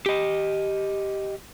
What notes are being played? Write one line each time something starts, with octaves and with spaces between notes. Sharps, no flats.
G4 D#5